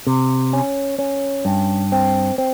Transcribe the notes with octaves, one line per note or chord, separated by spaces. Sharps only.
C3
C#4
C#4
G2
C4
C4